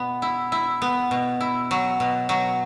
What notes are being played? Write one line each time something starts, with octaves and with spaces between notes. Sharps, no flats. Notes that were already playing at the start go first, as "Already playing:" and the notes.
Already playing: B2 B3
E4
E4
B3
B2
E4
F#3
B2
F#3